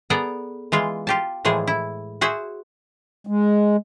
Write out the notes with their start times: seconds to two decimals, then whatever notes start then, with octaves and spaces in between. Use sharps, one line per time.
0.10 B3 G#4 A4 D5 A#5
0.72 E3 G#3 F4
1.07 F4 G4 A5
1.45 A2 E3 F3 G#3 G#4
1.67 E4
2.21 F#4 G#4 C5 E5
3.27 G#3